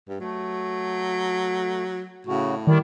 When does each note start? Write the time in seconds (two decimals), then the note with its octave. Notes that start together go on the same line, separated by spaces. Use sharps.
0.08 G2
0.20 F#3 A3
2.27 A2 C#3 F#4
2.67 D#3 G3 E4 D5